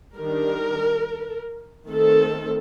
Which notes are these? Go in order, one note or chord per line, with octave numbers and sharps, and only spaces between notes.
D#3 G3 D4 A#4
D#3 A3 C4 A4